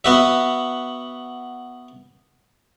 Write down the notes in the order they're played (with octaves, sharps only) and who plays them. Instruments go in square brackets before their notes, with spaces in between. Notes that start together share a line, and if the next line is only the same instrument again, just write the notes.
[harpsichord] B3 F#4 E5